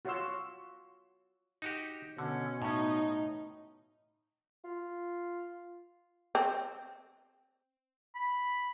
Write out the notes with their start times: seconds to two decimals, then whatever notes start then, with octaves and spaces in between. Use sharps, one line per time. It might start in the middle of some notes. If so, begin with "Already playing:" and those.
0.05 F4 F#4 C#5 F5 C6 E6
1.62 D#4 F#4 G4
2.18 B2 D3 C#4
2.62 A2 C#4 D#4
4.64 F4
6.35 C4
8.15 B5